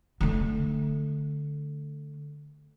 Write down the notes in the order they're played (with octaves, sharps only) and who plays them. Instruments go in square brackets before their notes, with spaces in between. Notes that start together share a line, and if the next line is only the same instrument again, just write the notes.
[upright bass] D3 A3